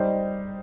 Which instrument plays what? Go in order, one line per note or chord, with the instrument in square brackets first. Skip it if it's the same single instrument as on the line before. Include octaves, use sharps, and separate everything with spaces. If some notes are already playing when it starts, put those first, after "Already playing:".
Already playing: [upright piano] G3 D#4 C5